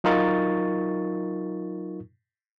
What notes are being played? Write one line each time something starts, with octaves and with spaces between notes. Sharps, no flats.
F#3 D#4 F4 A#4 C#6 A6